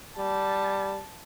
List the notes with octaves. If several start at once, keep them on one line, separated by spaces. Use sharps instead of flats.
G3 A5